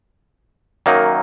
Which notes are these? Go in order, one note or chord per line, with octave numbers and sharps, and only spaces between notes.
F#2 D#3 F#3 A#3 D#4